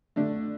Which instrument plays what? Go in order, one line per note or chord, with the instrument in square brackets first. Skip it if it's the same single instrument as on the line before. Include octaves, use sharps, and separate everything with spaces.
[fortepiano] D3 A3 D4